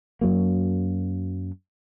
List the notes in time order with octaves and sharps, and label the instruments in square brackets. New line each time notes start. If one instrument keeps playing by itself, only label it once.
[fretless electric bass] F#2 F#3 A#3